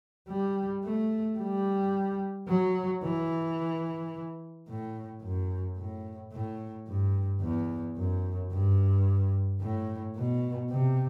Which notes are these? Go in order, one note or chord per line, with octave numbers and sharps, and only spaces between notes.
G3
A3
G3
F#3
E3
A2
F#2
A2
A2
G2
E2
F#2
G2
A2
B2
C3